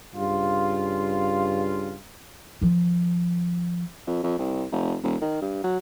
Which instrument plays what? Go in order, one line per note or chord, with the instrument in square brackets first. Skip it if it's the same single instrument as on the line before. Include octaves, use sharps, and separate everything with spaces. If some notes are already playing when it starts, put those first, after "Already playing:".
[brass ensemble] G2 C#3 F4
[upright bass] D#3 F3
[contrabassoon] F2
F2
C2
F1
E1
D#3
G2
F#3